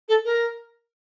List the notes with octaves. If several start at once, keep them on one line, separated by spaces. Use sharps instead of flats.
A4
A#4